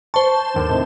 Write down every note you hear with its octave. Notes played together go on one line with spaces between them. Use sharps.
C5 A5 C#6
D#2 D3
A2 C3 D#3